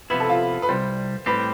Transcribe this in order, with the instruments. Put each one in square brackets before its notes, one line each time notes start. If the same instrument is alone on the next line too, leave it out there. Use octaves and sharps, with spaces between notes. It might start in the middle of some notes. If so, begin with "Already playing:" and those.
[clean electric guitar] C3 F3 B3 E4 [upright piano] B4
[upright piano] A4
F4
B4
[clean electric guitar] C2 C3 G3 [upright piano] C5
[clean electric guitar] A2 G3 C4 G4 [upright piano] B4